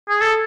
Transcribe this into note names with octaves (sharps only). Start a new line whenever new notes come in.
G#4
A4